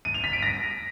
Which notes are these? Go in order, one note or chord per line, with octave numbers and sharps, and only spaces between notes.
D#7
F7
B6
D7
A#6